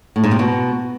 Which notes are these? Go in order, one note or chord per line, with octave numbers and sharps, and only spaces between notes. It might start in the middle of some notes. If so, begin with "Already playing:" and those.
A2
G#2
C3
B2